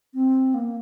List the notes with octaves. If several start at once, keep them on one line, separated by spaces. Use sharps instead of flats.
C4
A#3